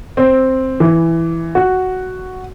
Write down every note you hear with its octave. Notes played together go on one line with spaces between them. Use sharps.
C4
E3
F#4